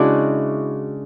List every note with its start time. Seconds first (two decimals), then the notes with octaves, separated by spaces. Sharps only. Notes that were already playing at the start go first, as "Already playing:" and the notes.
Already playing: C#3 G#3 D4 E4 F#4